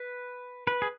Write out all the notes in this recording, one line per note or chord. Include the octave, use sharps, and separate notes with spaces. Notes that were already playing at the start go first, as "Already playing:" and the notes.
Already playing: B4
B4
G#4